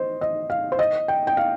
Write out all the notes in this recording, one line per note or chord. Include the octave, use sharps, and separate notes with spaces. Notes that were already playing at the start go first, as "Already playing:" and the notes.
Already playing: C5 D#5
D#5
F5
C5
D#5
G5
G5
F5